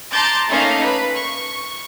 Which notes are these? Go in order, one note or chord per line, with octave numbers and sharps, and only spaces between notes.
A5 A#5 C6 D6 G6 A6
A3 A#3 C#4 D#4 F5 G#5
B4 B5
C#6